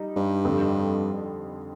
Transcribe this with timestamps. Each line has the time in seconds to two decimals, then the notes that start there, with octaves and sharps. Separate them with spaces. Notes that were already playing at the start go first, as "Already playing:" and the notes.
Already playing: G3 D#4
0.16 G2
0.45 F2 D3 G3